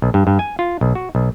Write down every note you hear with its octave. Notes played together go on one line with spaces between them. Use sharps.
B1
G2
G2
G#5
F4
B1
F#4
B1